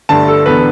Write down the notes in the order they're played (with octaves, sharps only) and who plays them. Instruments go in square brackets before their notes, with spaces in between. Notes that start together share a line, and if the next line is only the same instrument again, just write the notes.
[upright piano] G1 G2 D3 A3 [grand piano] A5
[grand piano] A4
[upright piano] E1 D3 B3 [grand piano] B4